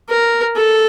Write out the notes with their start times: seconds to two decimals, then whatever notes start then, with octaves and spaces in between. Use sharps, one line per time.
0.09 A#4
0.56 A4